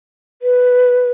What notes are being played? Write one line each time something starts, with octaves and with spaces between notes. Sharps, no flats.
B4